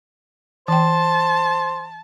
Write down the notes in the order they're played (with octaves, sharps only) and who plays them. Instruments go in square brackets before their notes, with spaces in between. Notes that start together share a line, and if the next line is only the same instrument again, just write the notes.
[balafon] E3 G5 [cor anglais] C5 [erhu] A5